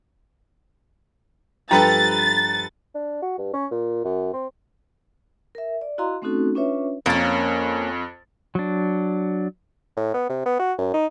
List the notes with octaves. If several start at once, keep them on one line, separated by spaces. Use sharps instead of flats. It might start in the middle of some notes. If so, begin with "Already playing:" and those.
G2 F3 G3 A4 B4 G5 A#5 A6
D4
F#4
G2
C#4
A#2
F#2
C4
A#4 E5
D5
E4 F#4 D#5 F5 A#5 C6
A3 C4 C#4 D#4 F#4 A4
C#4 D4 F4 B4 C#5 E5
F2 A#3 C#4 A6
F#3 D4
A2
B3
C3
B3
F#4
F#2
D#4